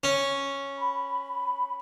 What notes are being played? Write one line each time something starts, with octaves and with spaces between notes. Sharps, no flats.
C#4
B5